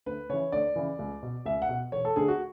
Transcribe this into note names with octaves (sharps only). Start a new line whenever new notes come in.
D2 B4
C#3 E3 C#5
D2 D5
C#3 E3
C#2
B2
C#2 E5
F#5
B2
E1 C#5
A4
D2 D3 G#4
F#4